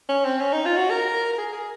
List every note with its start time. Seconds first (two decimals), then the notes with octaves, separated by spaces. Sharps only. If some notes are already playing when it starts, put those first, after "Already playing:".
0.09 C#4
0.25 C4
0.41 C#4
0.53 D#4
0.65 F4
0.77 F#4
0.90 A#4
1.33 A#4
1.38 G#4
1.53 G#4